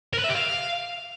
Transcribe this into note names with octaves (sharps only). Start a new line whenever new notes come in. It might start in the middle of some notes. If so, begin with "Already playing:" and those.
A#4
B4
E5
G4
F5